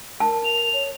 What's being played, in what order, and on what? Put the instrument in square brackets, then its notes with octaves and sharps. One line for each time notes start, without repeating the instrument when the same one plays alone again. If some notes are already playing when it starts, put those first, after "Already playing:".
[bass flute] A#4 [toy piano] A5
[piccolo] F7
[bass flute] C#5